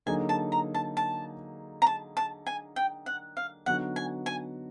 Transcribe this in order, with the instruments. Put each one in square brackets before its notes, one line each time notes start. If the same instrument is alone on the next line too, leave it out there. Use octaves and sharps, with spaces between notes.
[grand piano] D3 F#3 A#3 D#4 G#4 [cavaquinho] G#5
[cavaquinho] A5
A#5
A5
A5
A#5
A5
A5
G#5
G5
F#5
F5
[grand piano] D3 F#3 B3 D#4 F#4 [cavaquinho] F#5
[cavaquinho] G#5
G#5